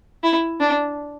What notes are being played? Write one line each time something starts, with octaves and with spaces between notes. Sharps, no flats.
E4
D4